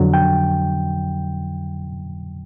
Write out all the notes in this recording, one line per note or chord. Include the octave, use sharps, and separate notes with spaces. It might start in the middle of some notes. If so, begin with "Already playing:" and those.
Already playing: F2 D3 F#3
G5